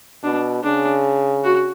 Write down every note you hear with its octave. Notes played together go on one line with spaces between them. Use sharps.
B2 D4
C#3 D4
F#4